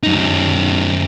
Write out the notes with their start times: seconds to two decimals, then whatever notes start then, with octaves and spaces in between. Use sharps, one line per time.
0.03 F#2 D#4